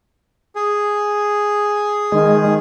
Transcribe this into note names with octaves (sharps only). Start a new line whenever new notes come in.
G#4
D#3 G#3